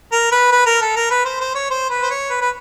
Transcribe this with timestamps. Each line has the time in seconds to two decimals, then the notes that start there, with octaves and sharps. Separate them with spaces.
0.12 A#4
0.32 B4
0.51 B4
0.66 A#4
0.81 A4
0.96 A#4
1.10 B4
1.25 C5
1.40 C5
1.55 C#5
1.70 C5
1.90 B4
2.02 C5
2.10 C#5
2.30 B4
2.41 B4